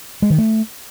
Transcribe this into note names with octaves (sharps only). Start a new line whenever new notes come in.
G#3
D#3
A3